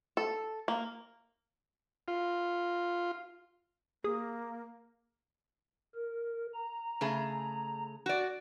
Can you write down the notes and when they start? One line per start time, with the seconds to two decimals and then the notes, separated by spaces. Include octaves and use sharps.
0.17 A4
0.68 A#3
2.08 F4
4.04 A#3 G#4 D#6
5.95 A#4
6.54 A#5
7.01 C#3 A3 G#4
8.06 F#4 D5